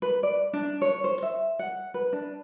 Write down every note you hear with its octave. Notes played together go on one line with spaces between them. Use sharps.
B4
D5
D4
C#5
C5
E5
F#5
B4
D4